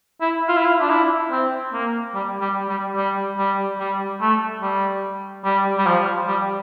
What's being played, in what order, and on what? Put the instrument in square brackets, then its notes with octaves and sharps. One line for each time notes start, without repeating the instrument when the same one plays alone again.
[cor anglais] E4
F4
E4
F4
D4
E4
C4
A#3
G3
G3
G3
G3
G3
G3
A3
G3
G3
G3
F3
G3